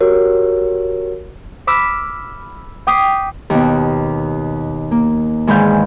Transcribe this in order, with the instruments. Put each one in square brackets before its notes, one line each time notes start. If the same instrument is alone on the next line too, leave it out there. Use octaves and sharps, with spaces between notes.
[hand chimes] F#4 G4 A#4 C#5
[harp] B5 D6 E6 F6 B6
G5 D6 D#6 B6 C7
D#2 B2
A#3
E2 G#2 D#3 B4 F5 G6